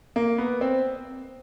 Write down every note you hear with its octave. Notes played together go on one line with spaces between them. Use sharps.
A#3
B3
C4